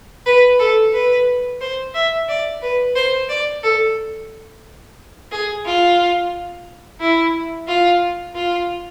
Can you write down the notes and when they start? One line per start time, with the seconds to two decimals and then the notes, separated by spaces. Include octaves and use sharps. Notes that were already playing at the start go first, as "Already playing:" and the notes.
0.26 B4
0.59 A4
0.93 B4
1.61 C5
1.94 E5
2.28 D5
2.62 B4
2.96 C5
3.29 D5
3.63 A4
5.32 G#4
5.65 F4
7.00 E4
7.68 F4
8.35 F4